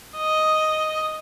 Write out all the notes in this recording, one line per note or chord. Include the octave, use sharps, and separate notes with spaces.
D#5